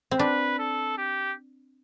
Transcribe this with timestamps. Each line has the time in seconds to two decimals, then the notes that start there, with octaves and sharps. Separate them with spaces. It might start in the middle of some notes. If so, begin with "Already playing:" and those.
0.11 C4
0.19 D4 B4
0.59 A4
0.98 G4